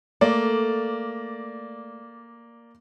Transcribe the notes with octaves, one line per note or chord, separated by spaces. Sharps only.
A3 A#3 D5